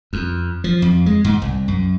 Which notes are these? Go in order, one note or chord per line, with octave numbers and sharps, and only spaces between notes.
F2
F3
F2
G#3
G#2
C2
F#2